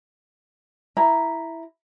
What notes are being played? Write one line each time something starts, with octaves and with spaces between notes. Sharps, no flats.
E4 A#5